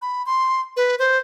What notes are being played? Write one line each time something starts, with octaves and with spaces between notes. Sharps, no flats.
B5
C6
B4
C5